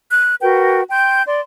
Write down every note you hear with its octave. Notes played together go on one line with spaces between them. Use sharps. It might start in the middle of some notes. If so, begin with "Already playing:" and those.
F#6
F#4 A#4 B4 G5
G5 C6 G6
D5 C6